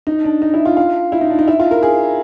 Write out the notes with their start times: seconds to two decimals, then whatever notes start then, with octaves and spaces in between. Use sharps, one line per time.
0.07 D#4
0.24 D4
0.42 D#4
0.54 E4
0.65 F4
0.77 F4
1.12 E4
1.21 D#4
1.30 D4
1.39 D#4
1.48 E4
1.60 F4
1.71 A#4
1.83 G#4